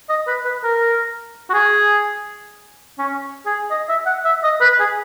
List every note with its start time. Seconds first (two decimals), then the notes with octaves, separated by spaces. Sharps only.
0.09 D#5
0.27 B4
0.45 B4
0.64 A#4
1.50 F#4
1.54 G#4
2.99 C#4
3.46 G#4
3.71 D#5
3.89 E5
4.06 F#5
4.25 E5
4.43 D#5
4.61 B4
4.80 G#4